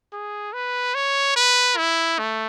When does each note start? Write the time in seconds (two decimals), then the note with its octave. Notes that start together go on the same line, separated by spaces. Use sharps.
0.12 G#4
0.53 B4
0.95 C#5
1.36 B4
1.77 E4
2.18 A3